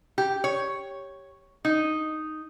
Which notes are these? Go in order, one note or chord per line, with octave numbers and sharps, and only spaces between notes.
G4
C#5
D#4